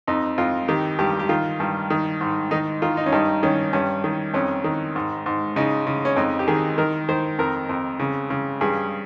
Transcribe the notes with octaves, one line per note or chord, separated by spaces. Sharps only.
F2 D#4
F2 F4
D#3 G4
G2 G4
G4
D#3 F4
G2
D#3
G#2
D#3 D#4
D#3 F4
D#4
C#4
G2 D#4
D#3 C#4
G2 C#4
D#3
F2 C#4
D#3
G#2
G#2
C#3 D#4
C#3
C#4
F2 D#4
G4
D#3 G#4
D#3 A#4
D#3 C5
F2 A#4
F2
C#3
C#3
G2 G#4